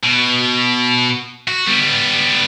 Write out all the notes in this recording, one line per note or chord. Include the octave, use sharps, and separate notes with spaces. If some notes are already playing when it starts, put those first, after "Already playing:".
B2
F#4
G3 B3